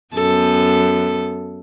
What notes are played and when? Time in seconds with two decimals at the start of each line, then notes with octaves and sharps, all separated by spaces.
0.14 F#2 B3 A4